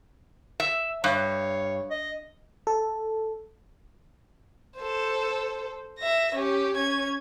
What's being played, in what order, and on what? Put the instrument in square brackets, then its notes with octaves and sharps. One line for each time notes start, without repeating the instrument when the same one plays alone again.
[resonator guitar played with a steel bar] E5
[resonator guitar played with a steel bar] G2 [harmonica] C#5 [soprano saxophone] F5
[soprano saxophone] D#5
[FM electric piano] A4
[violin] A4 C5
E5 A#6
C#4 G4
C#4 G#6